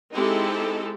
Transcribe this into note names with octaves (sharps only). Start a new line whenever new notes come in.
G#3 C4 D#4 E4 G4 A4